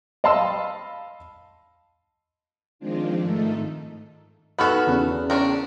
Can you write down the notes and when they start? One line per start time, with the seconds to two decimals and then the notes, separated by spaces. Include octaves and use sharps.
0.24 D#5 F5 A5 B5 C6 E6
2.79 D#3 F3 G#3 C4 D4 F4
3.21 G#2 D#3 A3 D#4 A4
4.59 B3 F#4 A4 B5 F6 F#6
4.87 E2 C#3
5.30 C#4 D4 A#4